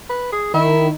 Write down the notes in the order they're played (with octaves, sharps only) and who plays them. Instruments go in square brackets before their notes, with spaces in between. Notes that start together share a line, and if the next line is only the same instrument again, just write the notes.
[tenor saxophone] B4
G#4
[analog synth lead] D#3 [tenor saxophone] E4